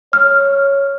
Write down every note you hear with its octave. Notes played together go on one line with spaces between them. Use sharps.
C#5 F6